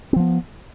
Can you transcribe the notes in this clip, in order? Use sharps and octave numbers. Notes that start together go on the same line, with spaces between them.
F3 B3 C4